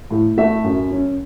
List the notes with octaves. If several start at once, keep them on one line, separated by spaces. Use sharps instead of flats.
A2
A3 E5
F#2
C#4